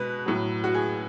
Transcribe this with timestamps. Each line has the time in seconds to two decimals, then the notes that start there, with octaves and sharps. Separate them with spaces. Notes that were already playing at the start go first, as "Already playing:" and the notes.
Already playing: B2 G#3 B4
0.26 A2 F#3
0.64 F#4
0.75 G#4